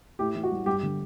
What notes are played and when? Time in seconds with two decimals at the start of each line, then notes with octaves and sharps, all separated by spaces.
0.19 A2 G4
0.35 E3
0.43 F#4
0.51 G3
0.66 G2 G4
0.83 D3